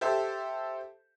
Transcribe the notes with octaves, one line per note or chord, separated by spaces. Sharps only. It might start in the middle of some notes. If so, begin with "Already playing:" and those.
G4 A4 C5 E5 A5